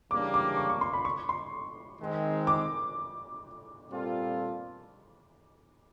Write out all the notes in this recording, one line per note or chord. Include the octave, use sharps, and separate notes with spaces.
C#3 E3 G3 A#3 D4 D6
D6
C#6
C#6
C6
B5
C#6
C6
D#3 G#3 C4
D6
A#2 G3 C4 F4 A4